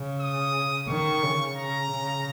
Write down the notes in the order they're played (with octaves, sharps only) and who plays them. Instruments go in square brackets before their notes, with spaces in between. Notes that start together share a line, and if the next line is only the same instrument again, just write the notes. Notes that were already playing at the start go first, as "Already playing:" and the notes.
Already playing: [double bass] C#3
[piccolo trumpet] D#6
[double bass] D#3 [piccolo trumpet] C#6
[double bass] C#3
[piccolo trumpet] A#5
[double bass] C#3